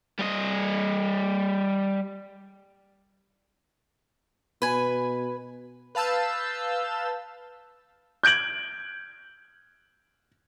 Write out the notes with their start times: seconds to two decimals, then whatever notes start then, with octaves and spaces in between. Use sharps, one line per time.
0.19 G3 D#5
4.62 B2 B4 G#5
5.95 B4 F5 A5 E6 G6
8.23 G6 G#6 D7 F#7